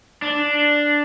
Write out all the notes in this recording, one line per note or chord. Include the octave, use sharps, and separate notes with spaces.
D4